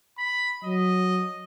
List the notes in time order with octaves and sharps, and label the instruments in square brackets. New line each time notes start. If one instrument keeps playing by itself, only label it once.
[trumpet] B5
[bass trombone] F#3 [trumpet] D#5